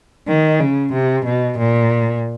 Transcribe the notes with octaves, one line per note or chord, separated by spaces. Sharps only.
D#3
C#3
C3
B2
A#2